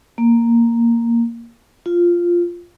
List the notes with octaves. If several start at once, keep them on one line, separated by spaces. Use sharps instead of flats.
A#3
F4